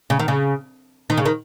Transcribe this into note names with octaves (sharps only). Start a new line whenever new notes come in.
C#3
D#3
C#3
D#3
C#3
D#3